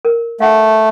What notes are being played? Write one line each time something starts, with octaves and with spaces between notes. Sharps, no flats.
A#4
A3 F5 F#5